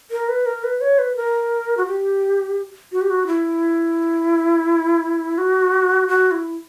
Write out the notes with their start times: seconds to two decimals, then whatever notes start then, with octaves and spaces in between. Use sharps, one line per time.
0.11 A#4
0.29 B4
0.46 A#4
0.64 B4
0.81 C#5
0.99 B4
1.16 A#4
1.77 F#4
1.87 G4
2.92 F#4
3.02 G4
3.10 F#4
3.27 E4
5.38 F#4
6.08 F#4
6.31 E4